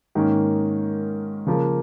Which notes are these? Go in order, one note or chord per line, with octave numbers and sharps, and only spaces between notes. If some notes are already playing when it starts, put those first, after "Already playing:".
G#2 D#3 A#3 C#4
C#3 F3 A#3